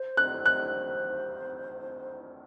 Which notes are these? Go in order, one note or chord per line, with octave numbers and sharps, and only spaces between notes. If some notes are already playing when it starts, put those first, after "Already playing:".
Already playing: C5
F#6
C5
F#6